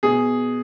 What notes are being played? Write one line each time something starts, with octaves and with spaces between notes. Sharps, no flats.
B2 G#4